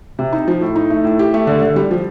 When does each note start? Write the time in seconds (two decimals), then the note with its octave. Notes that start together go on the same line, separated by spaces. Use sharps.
0.19 C3
0.32 D#4
0.48 F3
0.61 A2
0.76 D#4
0.90 A3
1.04 A2
1.19 G4
1.34 A3
1.47 D3
1.62 D3
1.76 G3
1.91 F3